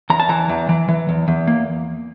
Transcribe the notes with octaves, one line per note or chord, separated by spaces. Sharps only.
E2 A#5
A5
E3 A#5
E2
E3
E3
E2
E2
A#3